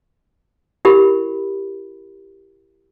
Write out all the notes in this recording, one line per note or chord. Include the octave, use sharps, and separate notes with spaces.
E4 G4 A#4 B5